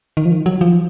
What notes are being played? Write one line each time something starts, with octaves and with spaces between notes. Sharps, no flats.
D#3
F3
D#3
F#3
F3